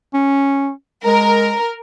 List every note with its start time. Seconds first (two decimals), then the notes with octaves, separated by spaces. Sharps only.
0.14 C#4
1.05 G#3 A#4